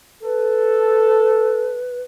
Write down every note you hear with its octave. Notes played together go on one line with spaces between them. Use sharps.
A4 B4